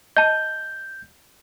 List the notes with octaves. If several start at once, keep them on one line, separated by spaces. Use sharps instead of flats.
D#5 A5 G6